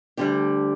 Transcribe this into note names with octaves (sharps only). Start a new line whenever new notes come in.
D2 D3 G3 G4